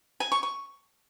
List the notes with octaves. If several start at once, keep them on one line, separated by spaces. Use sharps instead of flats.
G#5
C#6
C#6